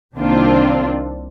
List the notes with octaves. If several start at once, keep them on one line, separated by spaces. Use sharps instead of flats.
C2 D#3 A#3 C4 D4 F4